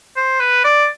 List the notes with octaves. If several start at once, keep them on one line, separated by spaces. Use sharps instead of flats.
C5
B4
D5